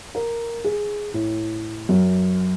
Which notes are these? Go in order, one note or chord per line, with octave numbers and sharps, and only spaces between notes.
A#4
G#4
A2
F#2